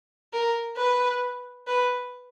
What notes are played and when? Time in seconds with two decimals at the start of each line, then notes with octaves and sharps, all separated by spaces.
0.33 A#4
0.77 B4
1.67 B4